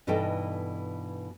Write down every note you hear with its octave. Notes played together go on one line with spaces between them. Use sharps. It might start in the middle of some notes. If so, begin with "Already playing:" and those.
G2 B2 E3 D#4 A4 G5